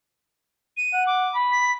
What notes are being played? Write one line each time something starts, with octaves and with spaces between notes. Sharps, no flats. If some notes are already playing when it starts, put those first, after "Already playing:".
D#7
F#5
D6
B5
B6